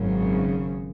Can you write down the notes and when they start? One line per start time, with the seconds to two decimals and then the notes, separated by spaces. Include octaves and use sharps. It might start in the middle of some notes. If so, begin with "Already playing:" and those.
Already playing: G#1 F#2 C#3